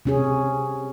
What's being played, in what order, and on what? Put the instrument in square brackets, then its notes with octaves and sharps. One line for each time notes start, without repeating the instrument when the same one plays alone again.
[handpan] C3 C#4 G#4